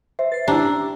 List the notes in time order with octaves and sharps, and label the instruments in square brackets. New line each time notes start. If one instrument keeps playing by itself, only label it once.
[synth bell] C5 [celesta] E5
[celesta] B4 [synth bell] A6 C7
[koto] D4 [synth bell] E4 G5 A#5 [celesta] G4